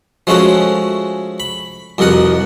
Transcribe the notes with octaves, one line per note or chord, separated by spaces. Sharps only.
F3 G#3 A3 C#4 F#4
B5
C2 F2 B2 A#4 F#5 D#6